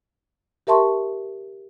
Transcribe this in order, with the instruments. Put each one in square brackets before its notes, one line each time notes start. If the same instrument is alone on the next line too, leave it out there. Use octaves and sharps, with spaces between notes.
[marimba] G4 A#4 E5 A5 C6 C#6